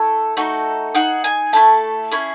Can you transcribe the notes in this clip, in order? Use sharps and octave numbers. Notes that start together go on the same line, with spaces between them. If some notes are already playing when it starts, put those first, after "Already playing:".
Already playing: A3 E4 A4 E6
A3 D#4 F#4 A4
D#4 G#4 F#5
G#5
A3 E4 A4 A5
C#4 E4 G#4